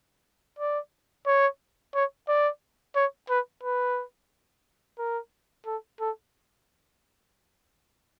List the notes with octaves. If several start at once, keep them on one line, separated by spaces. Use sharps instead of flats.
D5
C#5
C#5
D5
C#5
B4
B4
A#4
A4
A4